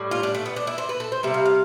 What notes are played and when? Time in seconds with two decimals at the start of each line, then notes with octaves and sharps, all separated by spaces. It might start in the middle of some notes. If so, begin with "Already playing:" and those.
Already playing: A2 G3
0.11 F4
0.23 D4
0.34 A3
0.45 B3
0.56 D4
0.67 E4
0.78 C5
0.89 B4
1.00 A4
1.12 C5
1.23 C3 G3 E5
1.34 F5
1.46 F5